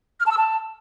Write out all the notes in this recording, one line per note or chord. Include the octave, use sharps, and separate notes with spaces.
F6
A5
E6
A5